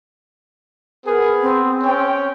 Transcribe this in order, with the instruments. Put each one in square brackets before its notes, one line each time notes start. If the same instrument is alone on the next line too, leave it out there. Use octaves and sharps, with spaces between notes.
[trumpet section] B3 G#4 [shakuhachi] A#4
[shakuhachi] C4
[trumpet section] C#4 G5